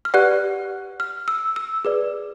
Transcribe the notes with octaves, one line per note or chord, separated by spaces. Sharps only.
F6
G4 B4 D5 F#5 F#6
F6
E6
E6
G#4 B4 D5